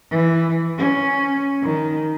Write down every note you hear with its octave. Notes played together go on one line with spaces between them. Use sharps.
E3
C#4
D#3